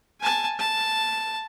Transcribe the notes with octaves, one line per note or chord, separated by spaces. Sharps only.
G#5 A5
A5